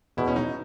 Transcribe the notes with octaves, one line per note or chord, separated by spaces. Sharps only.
E2 B2 G#3 E4
C#4
D#4